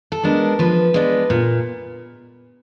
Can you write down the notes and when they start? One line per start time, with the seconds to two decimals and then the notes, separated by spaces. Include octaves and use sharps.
0.12 A4
0.23 G#3 B3 D4 A#4
0.59 F3 B4
0.94 G#3 B3 D4
1.30 A#2